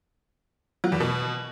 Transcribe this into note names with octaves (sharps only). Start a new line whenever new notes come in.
F#3
E2
B2